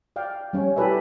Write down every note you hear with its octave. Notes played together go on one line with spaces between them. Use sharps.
D5 F5 G5
G3 C#4 C#5
E4 G4 A4 B4 D5 E5